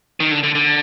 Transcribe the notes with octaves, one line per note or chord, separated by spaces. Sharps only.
D#3
D3
D3
D3